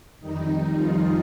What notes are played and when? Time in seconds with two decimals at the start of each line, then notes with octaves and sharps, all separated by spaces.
0.20 F2 D#3 G3 D#4
0.77 F3 F4